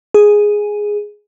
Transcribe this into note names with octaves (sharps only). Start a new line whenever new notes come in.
G#4